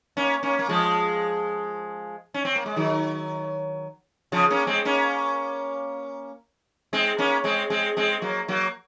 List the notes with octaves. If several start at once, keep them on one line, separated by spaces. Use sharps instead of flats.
A#3 C#4
A#3 C#4
A#3
F3 G#3
C#4
C4
A#3
G#3
D#3 F#3
C#3 F3
A#3 C#4
G#3 C4
A#3 C#4
G#3 C4
A#3 C#4
G#3 C4
G#3 C4
G#3 C4
F#3 A#3
F#3 A#3